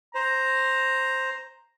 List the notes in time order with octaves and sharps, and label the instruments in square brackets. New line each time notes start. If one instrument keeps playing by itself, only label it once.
[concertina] C5 [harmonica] A#5